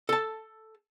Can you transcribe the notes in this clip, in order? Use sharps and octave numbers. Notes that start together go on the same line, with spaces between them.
A4 A5